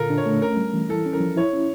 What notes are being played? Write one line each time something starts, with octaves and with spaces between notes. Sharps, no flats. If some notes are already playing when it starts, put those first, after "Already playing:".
Already playing: A#2 D3 F4 A4 A#4
D4
C#5
A3
C#4 A#4
G3
E3
E4 A4
C#4
A#4
F3
E4 C#5
C#4